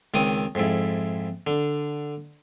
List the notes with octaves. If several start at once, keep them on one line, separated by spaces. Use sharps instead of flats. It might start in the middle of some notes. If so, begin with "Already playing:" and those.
C#2 D#3 C4 D6 D#6
F2 G#2 E4
D3